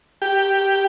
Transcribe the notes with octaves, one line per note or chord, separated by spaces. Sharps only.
G4